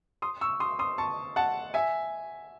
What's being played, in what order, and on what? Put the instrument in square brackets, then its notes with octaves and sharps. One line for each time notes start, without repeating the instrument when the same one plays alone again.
[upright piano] C6 D#6
C#6 E6
C6 D#6
C6 D#6
A5 C#6
F#5 A5
E5 G#5